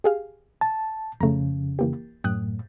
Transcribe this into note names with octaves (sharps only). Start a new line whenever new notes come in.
G4 G#4 F5
A5
F2 C#3 A3 A#5
E3 A#3 G4
F#2 A2 G5 D#6 F#6